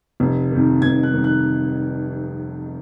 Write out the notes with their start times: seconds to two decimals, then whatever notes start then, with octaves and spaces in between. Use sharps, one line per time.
0.20 F1
0.52 F2 D#3
0.82 F1 G#6
1.03 F#6
1.14 F2 D#3
1.24 F#6